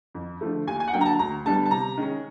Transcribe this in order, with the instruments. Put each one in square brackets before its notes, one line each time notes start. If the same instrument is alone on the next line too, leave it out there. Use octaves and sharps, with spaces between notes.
[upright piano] F2
D3 F3 A3
D#2 G#5
G#5
F#5
D3 F#3 A#3 D4 G5
A#5
A5
D2 A#5
D3 G3 B3 A5
A5
C3 A#5
D#3 G#3 C#4